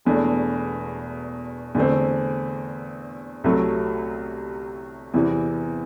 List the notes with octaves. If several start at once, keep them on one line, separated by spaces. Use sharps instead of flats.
E1 E2 B2 A3 D4
E2 D3 A3 C4
C2 C3 F#3 A3
E2 C3 E3